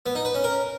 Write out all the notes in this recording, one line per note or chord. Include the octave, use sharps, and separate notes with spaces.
B3
D#4
B4
C#4
A#4